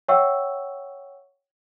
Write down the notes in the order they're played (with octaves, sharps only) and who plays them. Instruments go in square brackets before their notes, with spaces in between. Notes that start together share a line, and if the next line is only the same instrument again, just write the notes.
[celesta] C#5 E5 F#5 G5 C#6 E6